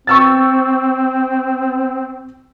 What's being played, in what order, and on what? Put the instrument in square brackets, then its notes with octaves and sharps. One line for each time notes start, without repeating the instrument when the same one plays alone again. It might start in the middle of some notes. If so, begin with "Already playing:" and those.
[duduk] C4 [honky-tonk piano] C#6 E6 A6